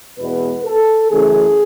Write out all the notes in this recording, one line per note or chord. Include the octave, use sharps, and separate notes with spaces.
E2 B2 G#3 B3 B4
A4
F#2 C#3 E3 A3 G#4